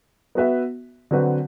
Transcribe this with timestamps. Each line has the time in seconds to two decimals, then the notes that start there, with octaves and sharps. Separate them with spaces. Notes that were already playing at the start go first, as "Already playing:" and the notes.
0.35 B3 F#4 B4 E5
1.11 D3 F#3 C4 F#4 B4